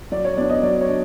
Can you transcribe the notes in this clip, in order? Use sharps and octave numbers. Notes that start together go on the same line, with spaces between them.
F#3 D5
C#5
B3 D4 D5
D#5
F#3 D5
C#5
D4